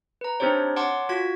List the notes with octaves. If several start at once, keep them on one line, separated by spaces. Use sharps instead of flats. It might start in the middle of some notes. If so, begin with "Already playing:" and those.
B4 A#5
C4 D4 D#4 G4 C5 C#5
C#5 F#5 A5 C6 D6
F4 F#4 G#6 B6